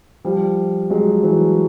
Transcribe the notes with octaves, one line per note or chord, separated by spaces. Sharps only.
F3 G3
F#3 G#3
E3 F#3